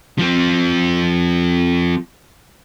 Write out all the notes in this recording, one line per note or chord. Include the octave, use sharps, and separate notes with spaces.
F3 C4